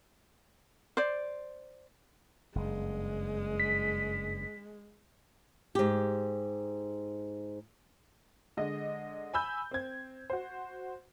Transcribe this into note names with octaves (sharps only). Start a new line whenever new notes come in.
C5 D5
F#1 G2 G#3
B6
G#2 G4
D3 G#3 D#5
G#5 B5 E6 G6
C4 G#6
F#4 C5